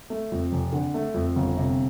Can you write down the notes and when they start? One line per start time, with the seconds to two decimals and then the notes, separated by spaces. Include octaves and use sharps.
0.10 A3
0.32 F2
0.52 F1
0.73 D3
0.94 A3
1.14 F2
1.36 G1
1.57 C3